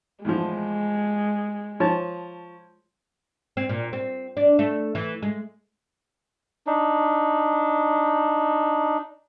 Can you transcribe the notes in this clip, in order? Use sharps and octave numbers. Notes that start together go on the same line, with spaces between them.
E2 A2 F3 G#3
F3 C#5 A5
C4
A#2
C4
D4
A3
E3
G#3
D4 D#4